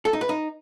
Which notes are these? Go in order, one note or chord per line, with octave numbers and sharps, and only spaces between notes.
A4
D#4
B4
D#4